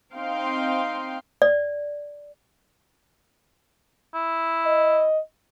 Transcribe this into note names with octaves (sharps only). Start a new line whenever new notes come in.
C4 D#4 F5 G5 C6
D5
E4
D#5